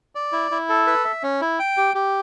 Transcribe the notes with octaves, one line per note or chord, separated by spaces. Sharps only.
D5
E4
E4
A4
B4
E5
C#4
E4
G5
G4
G4